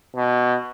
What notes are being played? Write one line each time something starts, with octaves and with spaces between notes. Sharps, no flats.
B2